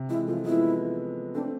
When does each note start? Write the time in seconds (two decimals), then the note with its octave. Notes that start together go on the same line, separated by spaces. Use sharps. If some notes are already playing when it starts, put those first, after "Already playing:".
Already playing: C3
0.09 E3 G#3 E4
0.27 F3 A3 F4
0.45 G#3 B3 E4
1.35 A3 C4 D4